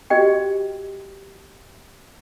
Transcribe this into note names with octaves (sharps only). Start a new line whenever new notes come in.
F#4 G4 D#5 G5